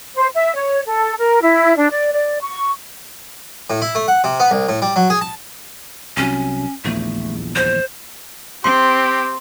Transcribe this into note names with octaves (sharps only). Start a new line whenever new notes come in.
C5
E5
C#5
A4
A#4
E4
D4
D5
D5
C#6
A2
E4
A3
F#5
C3
B3
C2
A2
G3
F#3
G#4
A5
C2 C3 F#3 C#4
D#1 A#1 E2 A3
C5
C4 G4 C6